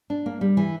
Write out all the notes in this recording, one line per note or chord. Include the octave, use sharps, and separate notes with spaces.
D4
A#3
G3
E3